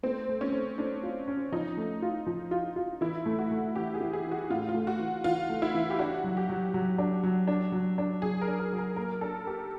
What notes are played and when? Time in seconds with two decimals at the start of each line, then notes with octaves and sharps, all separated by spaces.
0.03 A3 C4
0.29 A3
0.41 C#4
0.53 A3
0.78 A3 D4
1.03 F4
1.27 C#4
1.52 F3 D#4
1.77 A3
2.02 F4
2.26 F3
2.51 F4
2.76 F4
3.01 E3 E4
3.26 A3
3.39 F#4
3.51 A3
3.75 E3 G4
3.94 G#4
4.00 E3
4.13 G#4
4.26 E3
4.31 F#4
4.50 A2 F4
4.69 F4
4.74 A3
4.87 F#4
4.99 E3
5.24 E3 F4
5.50 A3
5.62 E4
5.74 E3
5.90 G4
5.99 D4 F#4
6.24 F#3
6.37 G4
6.49 F#3
6.74 F#3
6.98 D4
7.23 F#3
7.47 D4
7.72 F#3
7.98 D4
8.22 F#3 G#4
8.41 A#4
8.47 D4
8.60 A#4
8.73 F#3
8.78 A#4
8.96 A#3 A#4
9.21 D4 A4
9.47 A#3 G4